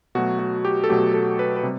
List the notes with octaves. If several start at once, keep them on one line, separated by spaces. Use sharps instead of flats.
B2 F#3 A3 F#4
F#4
G4
A4
B2 F#3 A3 G4
A4
B4
B4
C3 G3